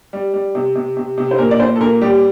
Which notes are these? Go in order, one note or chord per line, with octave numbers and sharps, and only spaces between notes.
G3
G3
C3
C3
C3
C3
C5
A#2 A#4
D5
A#2 C5
A4
A#2 A#4
G3 G4